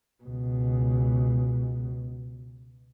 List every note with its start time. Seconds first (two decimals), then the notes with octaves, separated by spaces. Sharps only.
0.24 C#2 B2